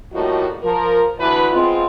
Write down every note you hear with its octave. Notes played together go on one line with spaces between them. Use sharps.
A2 F3 G3 A#3 D#4 F#4
F3 A#4
D2 E3 B4
G#3 B3 C4 F4